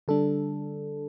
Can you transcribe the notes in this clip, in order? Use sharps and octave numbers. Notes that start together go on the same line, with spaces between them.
D3 G3 D4 A4